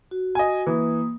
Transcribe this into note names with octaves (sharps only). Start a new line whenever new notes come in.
F#4
D#5 G#5
E3 A#3 D#6